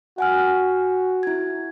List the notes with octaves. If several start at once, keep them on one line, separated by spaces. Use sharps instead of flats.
F#4 F#5 G#5 F6
E4 G#6